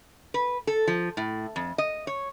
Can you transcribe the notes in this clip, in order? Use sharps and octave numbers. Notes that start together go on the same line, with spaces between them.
B4
A4
F3
A2
F2
D#5
C#5